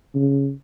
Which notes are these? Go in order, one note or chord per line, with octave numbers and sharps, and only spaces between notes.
C#3